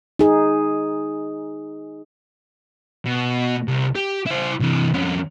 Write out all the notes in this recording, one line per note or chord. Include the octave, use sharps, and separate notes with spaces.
D#4 G#4
B2
C2
G4
E4 C5
C3 E3
F2 C#4